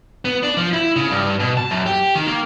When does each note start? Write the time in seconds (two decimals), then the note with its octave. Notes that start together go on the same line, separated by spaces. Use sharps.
0.25 B3
0.43 D4
0.57 F3
0.73 E4
0.96 C#3
1.11 G2
1.40 B2
1.57 A5
1.71 F#2
1.86 G4
2.15 D#3
2.27 A#3